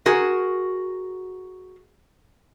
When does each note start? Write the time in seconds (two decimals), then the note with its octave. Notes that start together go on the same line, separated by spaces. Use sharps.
0.06 F#4 G#4 A#4